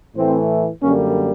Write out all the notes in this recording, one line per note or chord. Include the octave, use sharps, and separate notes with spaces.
A2 E3 A3 C4
F#2 D3 G3 A#3 C#4